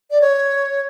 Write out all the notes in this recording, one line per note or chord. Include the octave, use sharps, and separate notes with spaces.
D5
C#5